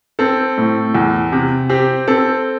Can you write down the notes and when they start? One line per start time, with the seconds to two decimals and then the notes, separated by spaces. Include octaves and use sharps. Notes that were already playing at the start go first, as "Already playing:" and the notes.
0.19 C4 A4
0.58 A2
0.95 E2
1.32 C3
1.69 C4 G4
2.08 C4 A4